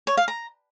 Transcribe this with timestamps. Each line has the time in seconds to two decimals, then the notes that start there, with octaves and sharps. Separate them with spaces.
0.07 C#5
0.17 F5
0.28 A#5